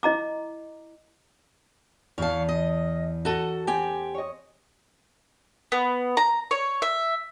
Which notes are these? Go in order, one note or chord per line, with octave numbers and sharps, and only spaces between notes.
E4 D#5 A#5 D6
E2 C#5 F5 A5
D#5
F#4 A4 A#5 D#7
C4 G4 G#5
C#5 D#5
B3
A#5
C#5
E5